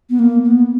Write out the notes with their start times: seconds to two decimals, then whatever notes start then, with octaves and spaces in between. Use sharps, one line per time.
0.10 B3
0.19 A#3
0.45 B3